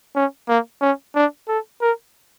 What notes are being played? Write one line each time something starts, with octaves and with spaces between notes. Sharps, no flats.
C#4
A#3
C#4
D4
A4
A#4